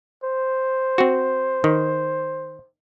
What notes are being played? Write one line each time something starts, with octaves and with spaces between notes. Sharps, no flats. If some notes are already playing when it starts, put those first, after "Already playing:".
C5
C4 F#4
D#3